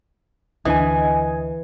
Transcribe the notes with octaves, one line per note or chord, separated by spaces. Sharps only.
D2 E3 D4 D#5 G#5